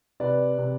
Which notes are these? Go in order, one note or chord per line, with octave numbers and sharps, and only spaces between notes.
C3 B4 D5
C3